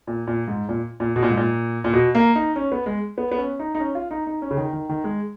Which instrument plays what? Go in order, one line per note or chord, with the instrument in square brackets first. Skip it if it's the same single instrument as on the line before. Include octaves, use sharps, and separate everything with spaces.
[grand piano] A#2
A#2
G#2
A#2
A#2
B2
A#2
G#2
A#2
A#2
B2
A#3
D#4
C#4
B3
G#3
B3
B3
C#4
D#4
D#4
C#4
F4
D#4
D#4
C#4
C#3
D#3
D#3
D#3
G#3